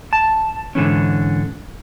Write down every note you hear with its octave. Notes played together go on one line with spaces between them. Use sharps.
A5
G#2 D3 E3 C#4